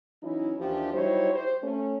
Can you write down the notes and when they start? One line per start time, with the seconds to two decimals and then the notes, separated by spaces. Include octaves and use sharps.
0.22 E3 F#3 C#4 D#4 E4
0.58 D#2 E3 F3 D4 G4
0.93 F#3 G3 D#4 E4 C5 C#5
1.33 G4 C5
1.62 A3 C#4